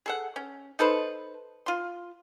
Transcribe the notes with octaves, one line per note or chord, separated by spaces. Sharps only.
G#4 A4 F#5
C#4
D#4 A4 B4 C5
F4 C6